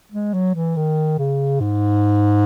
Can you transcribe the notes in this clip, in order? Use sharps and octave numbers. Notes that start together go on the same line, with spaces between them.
G#3
F#3
E3
D#3
C#3
G#2